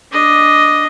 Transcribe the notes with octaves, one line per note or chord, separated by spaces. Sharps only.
D4 D#5